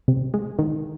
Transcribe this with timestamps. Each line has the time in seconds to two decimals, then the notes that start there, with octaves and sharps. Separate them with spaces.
0.08 C3
0.34 G#3
0.59 D#3